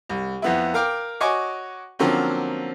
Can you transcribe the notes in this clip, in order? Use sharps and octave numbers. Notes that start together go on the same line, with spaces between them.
C2
F2 B3 E4
A#4 F5 G5 D6 F6
F#4 C#5 D#5 G#5 C#6 D6
D3 F3 F#3 A#3 C4 C#4